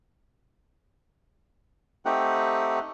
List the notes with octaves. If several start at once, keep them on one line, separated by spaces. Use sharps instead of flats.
A3 C4 D#4 G4 F#5